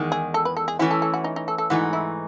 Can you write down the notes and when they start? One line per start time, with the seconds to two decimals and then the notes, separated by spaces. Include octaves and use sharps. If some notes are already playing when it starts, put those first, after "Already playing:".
Already playing: E2 D#3 G#3
0.12 G#4
0.34 A4
0.45 B4
0.57 A4
0.68 G#4
0.79 E3 A3 C#4 E4 F#4
0.91 A4
1.02 A4
1.14 F#4
1.24 D#4
1.36 D#4
1.48 A4
1.58 A4
1.70 G#2 E3 A3 D#4 F#4
1.93 E4